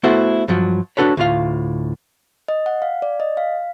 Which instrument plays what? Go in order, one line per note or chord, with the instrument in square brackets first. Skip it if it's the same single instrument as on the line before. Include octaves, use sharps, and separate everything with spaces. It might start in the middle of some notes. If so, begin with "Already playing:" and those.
[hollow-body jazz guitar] A3 B3 E4 F#4 A4 C5
G2 F3 F#3
D4 F4 F#4 A4 B4 C#5
D2 A2 F4 F5
[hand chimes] D#5
F#5
F5
D5
D#5
F5